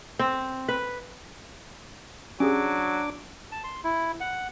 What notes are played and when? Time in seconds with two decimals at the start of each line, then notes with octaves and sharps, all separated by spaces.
0.19 C4
0.69 B4
2.40 F#3 C#4 D4 G4 G#4 D6
3.52 A5
3.64 C6
3.84 E4
4.20 F#5